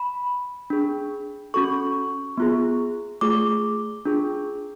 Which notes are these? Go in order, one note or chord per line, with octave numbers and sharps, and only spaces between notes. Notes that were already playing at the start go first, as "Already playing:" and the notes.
Already playing: B5
D4 G#4
C#4 F#4 A4 C#6
B3 F4 G#4
A3 F4 G#4 D6
D4 F4 G#4